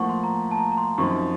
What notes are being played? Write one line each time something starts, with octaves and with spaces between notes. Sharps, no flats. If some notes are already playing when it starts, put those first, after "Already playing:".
Already playing: A2 F3 A#3 F#5 C#6
C6
A#5
A5
A#5
A#5
C6
F#2 F3 C4 D#4 C#6